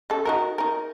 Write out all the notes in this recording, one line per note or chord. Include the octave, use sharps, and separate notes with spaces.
C#3 A4
D#4 F#4 A#4
D#4 A#4